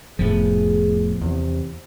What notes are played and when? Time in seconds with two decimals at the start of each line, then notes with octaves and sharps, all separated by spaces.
0.19 F1 A2 F3 B3 G#4
1.21 E2 C3